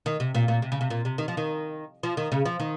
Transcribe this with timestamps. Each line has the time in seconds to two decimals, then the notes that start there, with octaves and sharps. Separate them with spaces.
0.06 D#3
0.20 C3
0.35 A#2
0.48 A#2
0.62 C3
0.72 C#3
0.81 C3
0.90 A#2
1.05 C3
1.18 D#3
1.28 F3
1.37 D#3
2.03 F3
2.17 D#3
2.32 C#3
2.45 F3
2.60 D#3